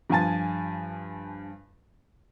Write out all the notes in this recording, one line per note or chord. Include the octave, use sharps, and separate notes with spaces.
G2 F3 F5 G#5 A5 A6